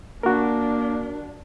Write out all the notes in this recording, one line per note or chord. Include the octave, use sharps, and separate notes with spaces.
A#3 D4 F#4 A#4